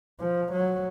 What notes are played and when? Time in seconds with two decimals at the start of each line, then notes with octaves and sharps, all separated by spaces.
0.20 F3
0.52 F#3